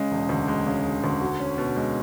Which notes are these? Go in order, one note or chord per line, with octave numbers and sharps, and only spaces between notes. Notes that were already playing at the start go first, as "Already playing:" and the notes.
Already playing: C#3 G#3
E1
D2
G#3
C#3
E1
D2
F#4
C#4
B2
G#3